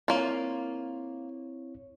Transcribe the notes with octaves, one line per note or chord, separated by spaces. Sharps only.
A#3 C4 E4 F4 C#5